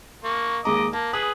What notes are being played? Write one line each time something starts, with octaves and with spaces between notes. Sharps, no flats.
A#3 C#6
D#2 G#3 D#5 A#5 D6
A#3 A5
G#4 B4 D#6